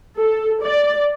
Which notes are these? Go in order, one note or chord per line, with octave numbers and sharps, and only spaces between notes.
A4
D5